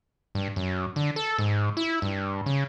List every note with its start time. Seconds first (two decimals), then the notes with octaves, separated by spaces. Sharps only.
0.35 G2
0.56 F#2
0.96 D3
1.16 A4
1.38 G#2
1.77 E4
2.02 G2
2.46 C#3